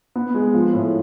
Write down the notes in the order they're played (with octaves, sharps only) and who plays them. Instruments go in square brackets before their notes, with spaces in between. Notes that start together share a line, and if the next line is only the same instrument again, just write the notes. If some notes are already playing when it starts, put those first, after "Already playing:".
[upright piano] B3
G#3
F3
A2